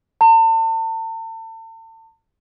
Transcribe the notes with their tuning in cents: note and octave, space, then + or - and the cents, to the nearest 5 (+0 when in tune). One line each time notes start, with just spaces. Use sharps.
A5 +40